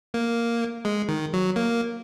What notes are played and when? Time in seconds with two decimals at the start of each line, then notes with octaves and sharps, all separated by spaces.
0.14 A#3
0.85 G#3
1.09 D#3
1.33 F#3
1.56 A#3